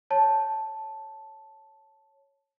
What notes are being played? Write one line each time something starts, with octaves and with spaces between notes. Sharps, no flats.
C#5 A5